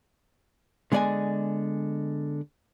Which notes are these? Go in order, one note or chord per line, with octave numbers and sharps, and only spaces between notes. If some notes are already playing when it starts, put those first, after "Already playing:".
D3 G#3 B3 D5 D#5 G#5